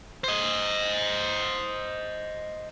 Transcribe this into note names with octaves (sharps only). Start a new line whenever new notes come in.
C5 D#5